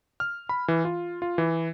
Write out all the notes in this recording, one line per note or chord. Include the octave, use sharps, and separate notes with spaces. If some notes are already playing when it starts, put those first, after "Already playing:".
F6
B5
E3
F4
F4
E3